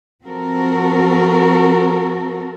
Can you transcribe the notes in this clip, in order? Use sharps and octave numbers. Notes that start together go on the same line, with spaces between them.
F3 C4 F#4 A4 A#4